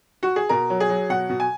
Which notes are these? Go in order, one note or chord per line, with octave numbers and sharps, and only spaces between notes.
F#4
G#4
B2 A#4
F#3
G#4
F#3
B2 F#5
B2
G#5